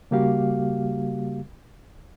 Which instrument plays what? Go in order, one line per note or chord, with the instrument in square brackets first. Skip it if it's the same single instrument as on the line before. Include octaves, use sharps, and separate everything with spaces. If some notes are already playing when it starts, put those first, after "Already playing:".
[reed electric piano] C#3 G3 A#3 F#4 G4 F5